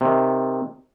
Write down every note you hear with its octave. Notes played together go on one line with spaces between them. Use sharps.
C3 D#3